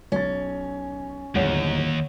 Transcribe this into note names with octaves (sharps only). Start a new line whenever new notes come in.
B1 C#4 A6
D1 G1 D#2 G#4 C#5 F#5 F7